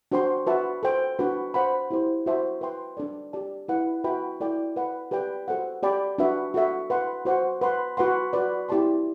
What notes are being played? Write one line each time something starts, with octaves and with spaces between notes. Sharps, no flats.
D4 F#4 C5 G5 C6
F#4 B4 E5 A5
A4 C5 G5
D4 F#4 B4
C5 F#5 B5
E4 G4 C5
F#4 C5 E5 A5
B4 E5 G5 C6
D4 A4 D5
G4 D5 A5
E4 B4 F#5
F#4 B4 E5 G5 B5
E4 A4 D5 G5
B4 F#5 B5
G4 B4 D5 G5
F#4 A4 C5 F#5
G4 D5 G5 B5
D4 F#4 B4 E5
F#4 A4 E5
B4 F#5 C6
F#4 C5 F#5 C6
B4 F#5 C6
F#4 B4 F#5 C6
F#4 B4 D5
E4 G4 D5 A5 C6